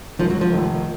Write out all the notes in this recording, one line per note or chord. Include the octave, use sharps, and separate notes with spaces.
G#1 F#2 D#3 F3
F#3
F3
F1 D#2 D#3